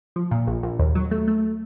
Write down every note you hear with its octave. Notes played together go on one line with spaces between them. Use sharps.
F3
A#2
A#1
A#1
D#2
F#3
A3
A3